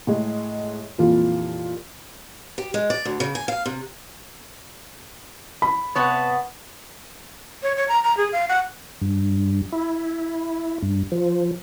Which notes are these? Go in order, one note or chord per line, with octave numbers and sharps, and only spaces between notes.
A2 G#3
F2 A#2 E3 G3 A#3 F4
G4
G#3
D5
D2
C#3
G#5
F5
C3
B5
C3 B3 B4 C#5 F#5 A5 D#6
C#5
C#5
A#5
A#5
G#4
F5
F#5
G2
E4
G2
F3